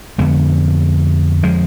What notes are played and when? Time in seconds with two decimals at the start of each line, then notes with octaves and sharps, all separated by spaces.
0.18 F2 D3 G#3 B3
1.43 F3 G#3